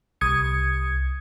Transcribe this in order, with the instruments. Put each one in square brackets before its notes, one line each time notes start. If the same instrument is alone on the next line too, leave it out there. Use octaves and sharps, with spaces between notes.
[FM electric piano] C2 D#6 G#6 C#7